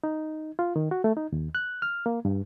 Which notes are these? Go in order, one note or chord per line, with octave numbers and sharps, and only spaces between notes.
D#4
F4
D#3
F#4
A3
D#4
D#2
F#6
F6
A#3
G2